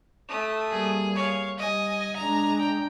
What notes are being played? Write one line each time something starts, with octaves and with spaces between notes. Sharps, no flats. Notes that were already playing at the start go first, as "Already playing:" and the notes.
A3 D#6
G3 A#3 G#4
C#5 F5
G3 D#5 G#5
G#3 D4 A#5
G5